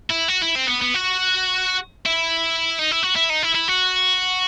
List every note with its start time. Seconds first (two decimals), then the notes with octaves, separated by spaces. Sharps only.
0.10 E4
0.28 F#4
0.42 E4
0.56 C4
0.68 B3
0.82 B3
0.94 F#4
2.06 E4
2.79 D#4
2.91 E4
3.03 F#4
3.16 E4
3.30 D#4
3.43 E4
3.55 E4
3.68 F#4